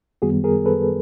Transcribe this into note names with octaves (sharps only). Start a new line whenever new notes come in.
F#2 D#3 G3 B3 F#4 G#4
G#4 A#4
A4 B4